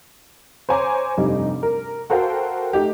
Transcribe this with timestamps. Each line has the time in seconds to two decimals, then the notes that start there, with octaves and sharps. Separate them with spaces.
0.69 C5 C#5 G#5 A#5 D6
1.17 F1 G2 G3 D#4
1.63 A#4
2.10 F#4 A4 A#4 C5 F5 G5
2.73 A3 D#4 G4